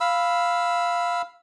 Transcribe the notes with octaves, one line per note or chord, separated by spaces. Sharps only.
F5 B5 E6